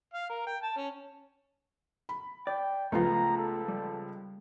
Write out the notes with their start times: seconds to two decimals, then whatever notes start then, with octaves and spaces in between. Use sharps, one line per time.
0.14 F5
0.29 A#4
0.47 G5
0.63 A5
0.77 C#4
2.09 B5
2.47 D5 G5
2.92 C#2 F3 A3 B3 F4 A#5
3.38 A4
3.68 G3